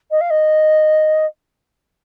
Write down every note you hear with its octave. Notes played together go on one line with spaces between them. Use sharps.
D#5
F5
D#5